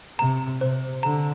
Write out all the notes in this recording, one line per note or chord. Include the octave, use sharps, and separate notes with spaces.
C3 A#5
C3 C5
D3 A#5